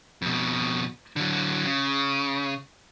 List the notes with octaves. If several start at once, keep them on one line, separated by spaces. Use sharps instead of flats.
F2 B2
D3 F#3
C#3